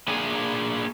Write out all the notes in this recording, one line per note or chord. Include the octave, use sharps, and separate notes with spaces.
A#3 D4 G#4 G#5